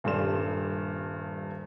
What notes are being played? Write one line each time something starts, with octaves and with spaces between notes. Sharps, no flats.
D#1 G2 D4 A4 C6 E7